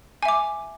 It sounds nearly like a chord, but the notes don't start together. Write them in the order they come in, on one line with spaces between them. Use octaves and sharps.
G#5 E5 D6